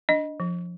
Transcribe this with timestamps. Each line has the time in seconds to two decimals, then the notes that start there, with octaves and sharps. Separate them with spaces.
0.09 D4 D#5
0.40 F3